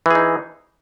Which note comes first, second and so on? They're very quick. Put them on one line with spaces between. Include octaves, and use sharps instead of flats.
E3 G#4 D#4